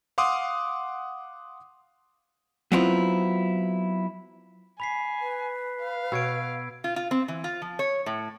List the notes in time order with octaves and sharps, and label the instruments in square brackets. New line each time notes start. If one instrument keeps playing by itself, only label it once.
[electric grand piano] F5 F#5 C6 D6 D#6
[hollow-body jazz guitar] F#3 B3 C4 E4 F4
[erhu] G#5 [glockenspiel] B5 B6 C7
[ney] B4
[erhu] F5
[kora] B2 C#5 [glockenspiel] E6 G#6 D7
[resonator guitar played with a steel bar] F4
F4
C4
E3
F4
F3
C#5
A2